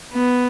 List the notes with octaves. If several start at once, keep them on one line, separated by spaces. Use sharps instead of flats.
B3